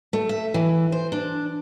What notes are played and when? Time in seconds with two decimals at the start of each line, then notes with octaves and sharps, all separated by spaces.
0.13 A3
0.29 E5
0.54 E3
0.92 C5
1.12 D4